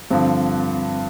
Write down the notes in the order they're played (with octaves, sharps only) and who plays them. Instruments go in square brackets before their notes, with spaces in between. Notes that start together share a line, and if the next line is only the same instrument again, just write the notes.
[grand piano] G2 D3 F3 [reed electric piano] C4